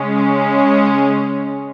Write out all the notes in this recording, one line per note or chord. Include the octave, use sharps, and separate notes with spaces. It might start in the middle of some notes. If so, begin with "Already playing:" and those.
Already playing: C#3 G#3 C#4